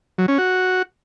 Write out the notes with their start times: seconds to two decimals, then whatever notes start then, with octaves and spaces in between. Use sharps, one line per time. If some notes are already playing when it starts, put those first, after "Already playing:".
0.18 F#3
0.28 C#4
0.38 F#4